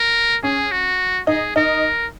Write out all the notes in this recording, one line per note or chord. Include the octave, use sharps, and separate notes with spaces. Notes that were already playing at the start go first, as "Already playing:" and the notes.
Already playing: A#4
C#4 G#4
F#4
D#4 G#4
D#4 A#4